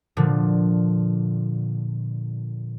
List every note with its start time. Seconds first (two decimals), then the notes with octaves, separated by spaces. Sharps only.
0.17 A#2 D3 F3